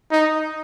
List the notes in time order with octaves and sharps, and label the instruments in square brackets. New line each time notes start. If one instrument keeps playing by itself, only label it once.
[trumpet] D#4